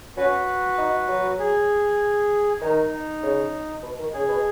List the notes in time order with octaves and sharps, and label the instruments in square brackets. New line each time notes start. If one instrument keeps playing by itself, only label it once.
[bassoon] C#4 [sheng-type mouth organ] F#4 B4
[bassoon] D#4
F#3
[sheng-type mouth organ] G#4
[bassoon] D#3 [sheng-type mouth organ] D#4
[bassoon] C#3
B2
D#3
[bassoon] C#3 [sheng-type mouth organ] G#4
[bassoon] B2